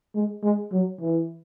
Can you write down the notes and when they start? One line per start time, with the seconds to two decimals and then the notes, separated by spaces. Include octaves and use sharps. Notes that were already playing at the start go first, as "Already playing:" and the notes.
0.15 G#3
0.44 G#3
0.72 F#3
1.00 E3